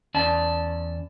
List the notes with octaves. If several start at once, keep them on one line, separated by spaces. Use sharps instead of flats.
E2 C#4 D5 A5